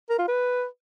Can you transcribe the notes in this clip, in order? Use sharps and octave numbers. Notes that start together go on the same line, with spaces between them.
A#4
F4
B4